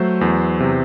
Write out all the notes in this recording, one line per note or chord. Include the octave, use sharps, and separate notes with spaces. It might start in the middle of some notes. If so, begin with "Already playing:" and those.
Already playing: F#3 A3 C5 E5
E2
C3